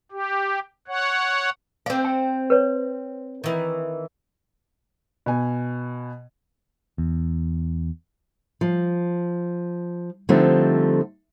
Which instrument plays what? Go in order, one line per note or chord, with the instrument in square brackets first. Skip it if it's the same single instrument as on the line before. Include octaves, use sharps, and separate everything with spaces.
[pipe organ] G4
C#5 F#5
[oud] C4 D5 [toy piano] F5
[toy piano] G5
B4 C#5
[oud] D#3 E3
[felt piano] B2 G#5
[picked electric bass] E2
[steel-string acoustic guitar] F3
D3 F3 G3 A3 C4 D#4